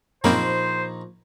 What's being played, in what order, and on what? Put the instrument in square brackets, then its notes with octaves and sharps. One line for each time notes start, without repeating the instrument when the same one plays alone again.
[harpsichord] A#1 D#4 B5 [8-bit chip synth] F#2 A#3 C4 [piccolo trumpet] C5